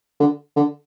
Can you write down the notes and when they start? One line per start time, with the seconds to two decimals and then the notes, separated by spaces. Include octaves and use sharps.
0.20 D3
0.56 D3